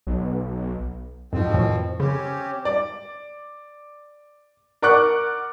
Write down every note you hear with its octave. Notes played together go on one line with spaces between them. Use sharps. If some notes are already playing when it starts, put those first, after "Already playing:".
B1
F2 G#2 B2 F3 C4
F2 A2 D#3
C#3 C4 C#4 G4
D5
A#4 D5 F#5 C#6 D6 F#6